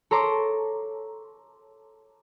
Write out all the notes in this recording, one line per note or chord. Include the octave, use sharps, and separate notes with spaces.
A4 C#5 A#5 C6 D6